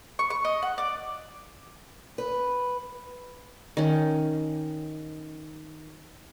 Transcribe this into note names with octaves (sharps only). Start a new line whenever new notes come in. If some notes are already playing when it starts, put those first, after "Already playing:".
C#6
C#6
D#5
F#5
D5
B4
D#3 C#4